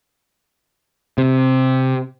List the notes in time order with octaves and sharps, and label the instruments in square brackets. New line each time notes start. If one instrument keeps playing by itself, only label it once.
[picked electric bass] C3